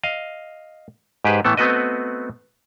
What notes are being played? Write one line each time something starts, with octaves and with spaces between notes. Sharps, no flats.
D#5 F5
G#2 G4 G#4 B4 C5
A2 E3 A3 B3 A4
A3 B3 C4 F#4 B4 D#5